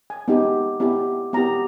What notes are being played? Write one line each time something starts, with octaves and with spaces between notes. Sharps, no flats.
G#5
B3 D#4 G4
B3 E4 G4
B3 E4 G4 A#5